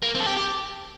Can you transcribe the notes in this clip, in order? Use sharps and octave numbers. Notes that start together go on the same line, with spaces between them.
A#3
C4
A4
G4
G4